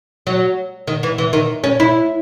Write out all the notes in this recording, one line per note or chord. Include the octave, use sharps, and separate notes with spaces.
F#3
D#3
E3
E3
D#3
C#4
E4